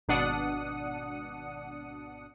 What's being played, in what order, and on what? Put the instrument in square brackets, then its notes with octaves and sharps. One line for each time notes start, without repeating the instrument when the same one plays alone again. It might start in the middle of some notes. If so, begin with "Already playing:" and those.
[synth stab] G#1 B2 D4 F#5 D#6 C#7